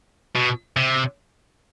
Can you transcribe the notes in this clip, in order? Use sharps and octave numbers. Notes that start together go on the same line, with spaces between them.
B2
C3